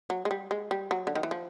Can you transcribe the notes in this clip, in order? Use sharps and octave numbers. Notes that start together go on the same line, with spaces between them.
F#3
G#3
G3
G#3
G3
F#3
D3
D#3
E3
F3